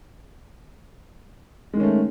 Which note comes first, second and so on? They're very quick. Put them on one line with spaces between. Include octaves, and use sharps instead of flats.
G#3 D#3 C#4 A3